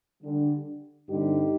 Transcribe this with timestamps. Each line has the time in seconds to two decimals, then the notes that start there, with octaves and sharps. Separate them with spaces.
0.23 D3 G3 D4
1.09 G2 D3 G3 C4 D#4 G4